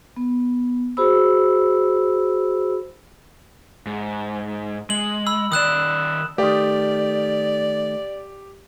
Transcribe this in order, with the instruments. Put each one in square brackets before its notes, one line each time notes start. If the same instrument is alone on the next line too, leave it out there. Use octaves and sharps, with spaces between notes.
[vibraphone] B3
F#4 G#4 C5 B5 E6
[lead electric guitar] G#2
[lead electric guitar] G#3 [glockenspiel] F#7
[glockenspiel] B5 E6
[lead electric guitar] D#3 D5 [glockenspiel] D#6 F#6 E7
[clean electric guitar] D#3 A3 [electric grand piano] G4 [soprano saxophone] D5